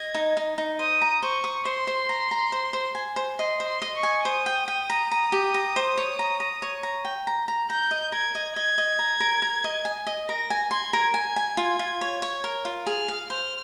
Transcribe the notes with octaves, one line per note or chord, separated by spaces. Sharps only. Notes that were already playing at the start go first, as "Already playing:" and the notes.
Already playing: D#5 G#6
D#4
D#4
D#4
C5 D#6
A#5
C5 C#6
D#6
C5 C6
C5
A#5
A#5
C5
C5
G#5
C5
D#5 C6
C5
C6
D#5
C#6
G#5
C5 D#6
G5
G5
A#5
A#5
G4
A#5
C5
C#5
A#5
A#5
C#5
A#5
G5
A#5
A#5
A#5 G6
D#5
A#4 G#6
D#5
D#5 G#6
D#5
A#5
A#4
A#4
D#5
G#5
D#5
A#4 A#6
G#5
C6 G#6
A#4
G#5 G#6
G#5
F4
F4
C#5
C#5
A#4
F4
G#4 F6
F5
C5 F6